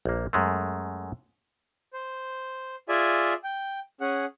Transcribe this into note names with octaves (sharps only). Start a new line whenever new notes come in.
A#1 A#3
F#2 G#3 A3
C5
F4 G#4 D5 E5 G#5
G5
C#4 G#4 F#5